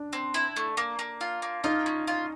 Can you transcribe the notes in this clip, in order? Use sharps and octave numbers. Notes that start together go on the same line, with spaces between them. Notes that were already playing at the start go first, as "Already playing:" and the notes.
Already playing: D4
C4
E4
A3
A#3
A#3
F4
A#3
D#4 F4
C#4
F4